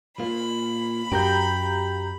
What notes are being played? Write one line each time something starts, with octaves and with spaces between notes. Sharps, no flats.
A#3 F4 B5
F#2 G4 F5 G5 A#5 G6